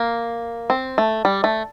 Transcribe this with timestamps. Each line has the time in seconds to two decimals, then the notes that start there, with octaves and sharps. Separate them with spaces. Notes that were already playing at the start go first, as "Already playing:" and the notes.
Already playing: A#3
0.70 C4
0.98 A3
1.25 G3
1.44 A3